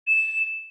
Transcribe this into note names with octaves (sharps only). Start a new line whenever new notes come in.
E7